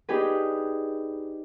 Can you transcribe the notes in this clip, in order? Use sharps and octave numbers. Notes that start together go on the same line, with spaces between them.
D4 D#4 G4 G#4 B4